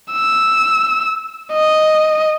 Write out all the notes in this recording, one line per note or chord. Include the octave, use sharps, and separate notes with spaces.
E6
D#5